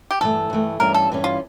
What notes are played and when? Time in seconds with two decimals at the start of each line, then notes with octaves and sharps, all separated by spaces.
0.11 G4
0.21 G2 E3 A3 A4
0.50 G2 E3 A3
0.79 G2 E3 G3 C#4 A#4
0.94 A4
1.10 G2 E3 G3 C#4
1.24 F4